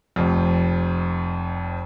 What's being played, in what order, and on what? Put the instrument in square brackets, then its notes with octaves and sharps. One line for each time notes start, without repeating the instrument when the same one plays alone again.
[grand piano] F1 F2